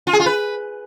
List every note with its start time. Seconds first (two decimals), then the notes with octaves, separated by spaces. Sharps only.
0.07 F4
0.13 G#4
0.20 F4
0.26 B4